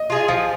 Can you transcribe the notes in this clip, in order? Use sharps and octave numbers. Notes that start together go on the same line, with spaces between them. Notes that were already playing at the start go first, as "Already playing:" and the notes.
Already playing: D#5
F4 G#4
F3 F5